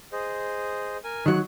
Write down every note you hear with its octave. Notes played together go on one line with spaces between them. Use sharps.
G#4 C5 D#5
A#4 G#5
D#3 F#3 F#6